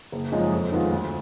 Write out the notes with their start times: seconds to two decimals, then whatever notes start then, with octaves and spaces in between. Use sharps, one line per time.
0.12 F#1
0.32 F#2 F3 G#3 D#4
0.52 F2
0.72 D#3 G#3 B3 F4
0.91 D2